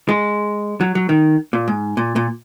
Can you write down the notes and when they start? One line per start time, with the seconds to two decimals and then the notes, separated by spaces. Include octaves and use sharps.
0.09 G#3
0.81 F#3
0.95 F#3
1.09 D#3
1.53 A#2
1.68 G#2
1.97 A#2
2.16 A#2